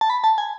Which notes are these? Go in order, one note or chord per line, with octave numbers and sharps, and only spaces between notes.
A5
B5
A5
G#5